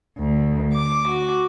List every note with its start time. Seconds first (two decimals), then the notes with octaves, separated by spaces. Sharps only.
0.17 D2
0.73 D6
1.08 F#4